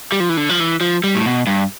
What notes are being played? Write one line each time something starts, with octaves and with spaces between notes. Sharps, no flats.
G3
F3
E3
D3
F3
E3
F3
G3
A2
B2
G2